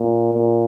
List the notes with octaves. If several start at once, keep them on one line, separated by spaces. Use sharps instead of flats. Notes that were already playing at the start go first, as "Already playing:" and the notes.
Already playing: A#2
A#2